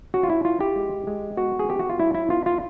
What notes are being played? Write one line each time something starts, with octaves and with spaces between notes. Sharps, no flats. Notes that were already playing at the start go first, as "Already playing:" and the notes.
C#4 F#4
F4
E4
E4 F4
G4
G#3
G#3
B3 F#4
G#4
B3 G4
F#4
F4
F#3 E4
E4
B3 F4
F4